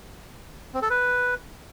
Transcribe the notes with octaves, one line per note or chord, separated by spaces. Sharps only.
C4
A4
B4